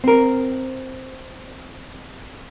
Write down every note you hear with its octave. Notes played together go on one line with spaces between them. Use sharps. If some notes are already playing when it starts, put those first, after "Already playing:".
C4 A#4